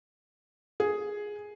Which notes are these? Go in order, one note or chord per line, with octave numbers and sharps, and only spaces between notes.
G#4